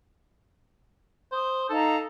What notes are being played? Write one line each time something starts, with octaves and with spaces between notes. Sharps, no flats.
C5 D#6
D#4 A4 F5 A#5